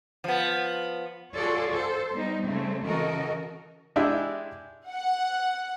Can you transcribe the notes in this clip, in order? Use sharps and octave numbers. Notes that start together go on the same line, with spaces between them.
F3 B3
F4 F#4 G#4 A4 C#5 D5
A4 C5
G3 B3 D#4
C#3 G3 A3 C4
C#3 E3 F#4 A4 A#4 D#5
G#3 D4 E4 G4 E5
F#5